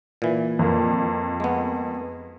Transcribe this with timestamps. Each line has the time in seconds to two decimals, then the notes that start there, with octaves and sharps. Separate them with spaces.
0.22 A#2 E3
0.59 F2 A#3
1.40 G#3 B3